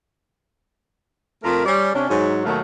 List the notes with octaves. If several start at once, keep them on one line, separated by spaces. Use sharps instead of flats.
F2 A3 F4 A#4
G3 C#4 D5
C3 C#4 D4
G#2 F#3 C#5
D#2 B2 D#3 F#3 A3 F5